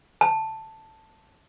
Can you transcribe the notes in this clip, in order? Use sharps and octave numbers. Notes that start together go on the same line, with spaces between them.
A5